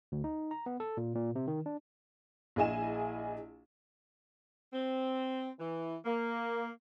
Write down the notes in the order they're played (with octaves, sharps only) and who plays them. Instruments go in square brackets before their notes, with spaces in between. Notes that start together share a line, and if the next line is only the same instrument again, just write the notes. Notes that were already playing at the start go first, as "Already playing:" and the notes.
[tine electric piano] D2
D#4
A#5
B3
A4
A#2
A#2
C3
D#3
D4
[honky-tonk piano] A#1 E4 G#4 D#5 G#5 E7
[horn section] C4
E3
A#3